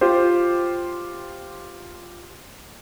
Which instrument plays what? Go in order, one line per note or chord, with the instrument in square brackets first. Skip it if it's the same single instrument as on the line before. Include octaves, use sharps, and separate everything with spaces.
[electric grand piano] F4 G4 C5